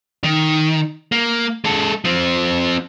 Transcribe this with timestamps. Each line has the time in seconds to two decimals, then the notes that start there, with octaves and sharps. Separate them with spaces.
0.24 D#3
1.12 A#3
1.64 G#3 A4
2.05 F3 C4